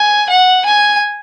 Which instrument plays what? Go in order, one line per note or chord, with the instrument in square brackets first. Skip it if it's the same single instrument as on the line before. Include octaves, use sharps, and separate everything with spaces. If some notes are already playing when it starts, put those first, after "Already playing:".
Already playing: [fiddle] G#5
F#5
G#5